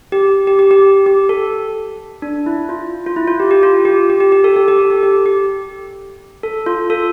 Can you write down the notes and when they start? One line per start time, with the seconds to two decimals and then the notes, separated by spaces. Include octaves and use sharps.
0.12 G4
0.47 G4
0.59 G4
0.71 G4
1.06 G4
1.29 A4
2.22 D4
2.46 E4
2.69 F4
3.06 F4
3.16 E4
3.28 F4
3.40 G4
3.51 G4
3.63 F4
3.85 G4
4.10 G4
4.20 G4
4.32 G4
4.44 A4
4.56 G4
4.68 G4
4.79 A4
4.90 G4
5.03 G4
5.26 G4
6.43 A4
6.66 F4
6.90 A4